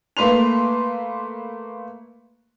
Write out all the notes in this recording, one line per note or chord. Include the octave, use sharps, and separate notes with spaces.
A3 A#3 B4 C6 F7